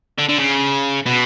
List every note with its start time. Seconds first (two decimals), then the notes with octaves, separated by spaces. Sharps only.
0.18 D3
0.29 D3
0.38 C#3
1.06 B2